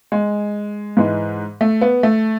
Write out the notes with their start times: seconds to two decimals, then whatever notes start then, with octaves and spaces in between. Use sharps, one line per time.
0.12 G#3
0.97 G#2 E3 G#3
1.61 A3
1.81 B3
2.03 A3